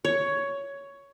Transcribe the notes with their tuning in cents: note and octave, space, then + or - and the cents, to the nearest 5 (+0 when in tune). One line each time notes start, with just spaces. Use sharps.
C#5 +10